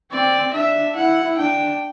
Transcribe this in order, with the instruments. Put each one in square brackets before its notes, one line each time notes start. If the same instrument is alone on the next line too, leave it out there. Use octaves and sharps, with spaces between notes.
[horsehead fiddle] C4 [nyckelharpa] D5
[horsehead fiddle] D4 [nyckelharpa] E5
[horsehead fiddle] E4 [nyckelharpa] F#5
[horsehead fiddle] D4 [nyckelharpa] G5